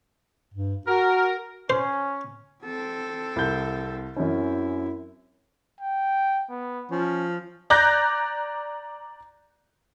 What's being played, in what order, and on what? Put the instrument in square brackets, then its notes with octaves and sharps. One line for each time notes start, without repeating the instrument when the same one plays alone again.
[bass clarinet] G2
[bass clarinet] F#4 [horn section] A#4
[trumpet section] C#4 [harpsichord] C5
[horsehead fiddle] C4 A4
[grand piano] C2 G6
[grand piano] F#2 C4 C#4 [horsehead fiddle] E4
[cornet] G5
B3
[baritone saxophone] F3 [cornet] C#4
[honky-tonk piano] D5 A#5 D6 F#6 G6 A#6